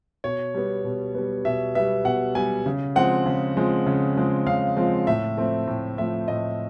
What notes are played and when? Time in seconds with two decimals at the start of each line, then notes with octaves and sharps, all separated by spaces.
0.24 B2 C#5
0.54 G3 B3
0.84 B2
1.15 G3 B3
1.45 B2 E5
1.75 B3 E5
1.79 G3
2.05 B2 F#5
2.35 G3 B3 G#5
2.66 C#3
2.96 F3 G#3 C4 F#5
3.26 C#3
3.57 F3 G#3 C4
3.86 C#3
4.16 F3 G#3 C4
4.47 C#3 F5
4.76 F3 G#3 C4
5.07 A2 E5
5.37 F3 A3 C4
5.67 A2
5.97 F3 A3 C4 E5
6.28 A2 D#5